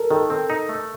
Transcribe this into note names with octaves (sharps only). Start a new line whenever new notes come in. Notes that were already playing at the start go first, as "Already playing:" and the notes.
Already playing: A4 A#4
D#3 A4
C4
D#4
A3